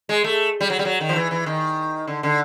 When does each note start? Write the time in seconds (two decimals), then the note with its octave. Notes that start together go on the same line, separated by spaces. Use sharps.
0.09 G#3
0.24 A3
0.60 G3
0.70 F#3
0.79 G3
0.85 F#3
1.00 D#3
1.09 F3
1.16 E3
1.31 E3
1.46 D#3
2.07 D3
2.23 D3